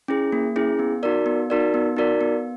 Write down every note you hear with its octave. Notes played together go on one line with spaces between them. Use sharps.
C#4 E4 G#4
A#3
C#4 E4 G#4
B3
D#4 F#4 A#4 D5
B3
D#4 F#4 A#4 D5
B3
D#4 F#4 A#4 D5
B3